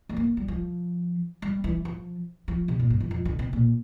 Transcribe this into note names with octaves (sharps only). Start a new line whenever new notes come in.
A3
A#3
G3
F3
G3
E3
F3
F3
C3
A#2
G2
F2
F2
D3
C3
A#2